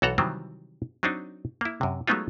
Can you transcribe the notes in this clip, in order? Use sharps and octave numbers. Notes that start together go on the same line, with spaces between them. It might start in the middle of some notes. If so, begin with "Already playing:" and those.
B1 E3 F#4 A4 F#5 A#5
C3 D#3 E3 F#3 G3 C4
F#3 C4 D4 D#4
A#3 E4
F#2 C3
F#3 G#3 A3 B3 D#4 F4